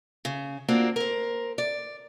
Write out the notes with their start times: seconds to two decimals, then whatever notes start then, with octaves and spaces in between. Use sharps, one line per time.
0.25 C#3
0.68 A#3 C4 D4 F4 F#4
0.96 A#4 C5
1.58 D5